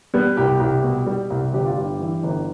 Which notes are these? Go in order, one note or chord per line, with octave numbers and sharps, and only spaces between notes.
G3 B3
C2 G4
C2 G4
B2
G3
C2
G1 G4
F4
G2 G4
E3
G1